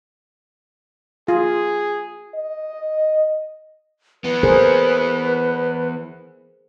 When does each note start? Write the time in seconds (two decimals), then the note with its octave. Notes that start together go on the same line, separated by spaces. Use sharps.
1.28 F4 G#4
2.35 D#5
4.24 E3 B3 B4
4.43 G#4 A#4 C5